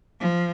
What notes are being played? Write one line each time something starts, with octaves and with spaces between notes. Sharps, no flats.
F3